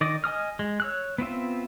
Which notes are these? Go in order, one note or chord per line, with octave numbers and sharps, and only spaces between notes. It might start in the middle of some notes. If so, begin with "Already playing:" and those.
D#3 D5 D#5
D#5 G#5 D#6 F6
G#3
C#5 E6 F#6
B3 C4 F4 E5